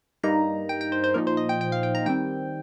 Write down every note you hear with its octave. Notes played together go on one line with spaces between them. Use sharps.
G2 G3 A#3 D#4 A#5
G5
G5
C5
C5
A#2 F3 D#4 A#4
C5
D#5
G5
G5
F5
G5
A#5
D#3 G3 C4 G5